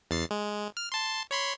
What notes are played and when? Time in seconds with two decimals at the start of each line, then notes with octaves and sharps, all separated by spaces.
0.11 E2 A6 C7
0.31 G#3
0.77 F6
0.92 A5 C6
1.31 C#5 B5 C6